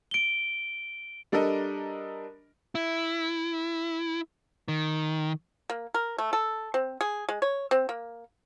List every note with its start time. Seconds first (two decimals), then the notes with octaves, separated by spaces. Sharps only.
0.11 D7 G7
1.32 G3 D4 A4 A#4 D#5
2.75 E4
4.68 D#3
5.70 A#3
5.94 A#4
6.18 A3
6.33 A4
6.74 C4
7.01 G#4
7.29 G#3
7.42 C#5
7.71 C4
7.89 A#3